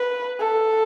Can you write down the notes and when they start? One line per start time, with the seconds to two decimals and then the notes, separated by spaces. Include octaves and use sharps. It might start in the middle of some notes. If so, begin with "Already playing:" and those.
Already playing: B4
0.39 A4